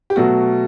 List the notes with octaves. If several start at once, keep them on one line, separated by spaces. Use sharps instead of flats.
G4
B2 F#3 A3 F#4